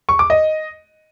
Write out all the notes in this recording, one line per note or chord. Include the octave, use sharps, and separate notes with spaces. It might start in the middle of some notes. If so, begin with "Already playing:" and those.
C#6
D6
D#5